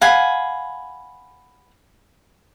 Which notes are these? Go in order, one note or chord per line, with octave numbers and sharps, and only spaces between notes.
F5 F#5 G#5 B5